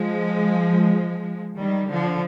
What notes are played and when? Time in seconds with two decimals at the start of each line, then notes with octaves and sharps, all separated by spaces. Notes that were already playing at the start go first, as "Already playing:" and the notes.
Already playing: F3 G#3
1.59 D#3 G3
1.89 D3 F3